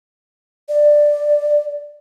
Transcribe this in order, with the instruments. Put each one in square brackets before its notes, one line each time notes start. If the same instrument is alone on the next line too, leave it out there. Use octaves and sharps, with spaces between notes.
[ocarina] D5